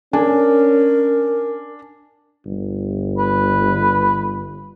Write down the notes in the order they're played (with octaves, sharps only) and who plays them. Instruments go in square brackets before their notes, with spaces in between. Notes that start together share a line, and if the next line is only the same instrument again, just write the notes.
[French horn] C#4 [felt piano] D4 G#5 [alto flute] A#4
[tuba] G1
[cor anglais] B4